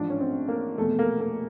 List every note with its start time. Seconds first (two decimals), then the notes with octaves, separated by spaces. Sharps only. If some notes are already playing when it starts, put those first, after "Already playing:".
Already playing: A1 G#2 F3 D4
0.10 C#4
0.20 C4
0.48 A#3
0.77 F1 E2 B2 A3
0.99 A#3
1.20 A#3